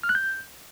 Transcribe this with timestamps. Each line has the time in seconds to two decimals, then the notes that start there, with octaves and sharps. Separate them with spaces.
0.03 F6
0.09 F#6
0.15 G6